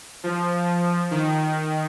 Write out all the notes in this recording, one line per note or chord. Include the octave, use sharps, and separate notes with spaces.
F3
D#3